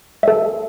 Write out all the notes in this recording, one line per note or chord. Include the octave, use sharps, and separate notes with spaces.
A4 E5